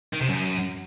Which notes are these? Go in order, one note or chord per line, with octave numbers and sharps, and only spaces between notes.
D#3
C3
F#2